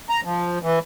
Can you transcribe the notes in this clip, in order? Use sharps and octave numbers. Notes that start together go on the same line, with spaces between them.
A#5
F3
E3